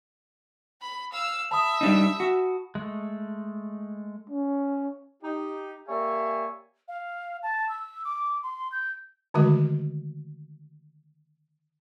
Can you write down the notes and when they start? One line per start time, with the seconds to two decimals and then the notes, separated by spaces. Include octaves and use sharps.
0.81 B5
1.13 F5 E6
1.51 E5 A5 B5 D#6
1.81 G3 D4 D#4
2.20 F#4
2.75 G#3 A3
4.30 C#4
5.23 D#4 G4
5.87 A#3 G4 C#5 D5 E5 G#5
6.88 F5
7.43 A5
7.69 E6
8.05 D6
8.43 C6
8.72 G6
9.34 D3 D#3 G#3 A3 F#4 D#5